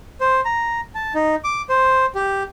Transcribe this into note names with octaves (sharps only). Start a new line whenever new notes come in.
C5
A#5
A5
D#4
D6
C5
G4